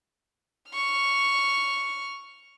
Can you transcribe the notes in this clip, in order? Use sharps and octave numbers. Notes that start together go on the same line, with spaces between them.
C#6 F6